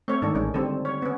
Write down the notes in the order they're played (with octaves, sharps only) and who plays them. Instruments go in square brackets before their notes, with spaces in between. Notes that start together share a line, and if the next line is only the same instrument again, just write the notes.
[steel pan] A3 C#5 [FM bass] C4
[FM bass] G#2 [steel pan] D#3 D4 A4
[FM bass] A1 [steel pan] G#3 C#4
[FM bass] D3 [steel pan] G3 C4 A4
[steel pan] C#5
B3 C#4